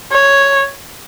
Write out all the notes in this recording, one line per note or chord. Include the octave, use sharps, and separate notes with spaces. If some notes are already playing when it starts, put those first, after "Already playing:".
C#5